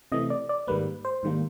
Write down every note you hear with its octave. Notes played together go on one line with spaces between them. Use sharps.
C3 E3 A3 D#5
D5
D5
G#2 D#3 G3 A#3 B4
C5
G#2 D#3 G3 A#3